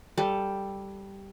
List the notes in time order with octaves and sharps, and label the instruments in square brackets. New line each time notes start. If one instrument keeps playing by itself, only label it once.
[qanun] G3 A4